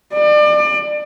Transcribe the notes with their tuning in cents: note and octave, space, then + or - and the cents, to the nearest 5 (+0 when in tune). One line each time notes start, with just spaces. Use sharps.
D5 +30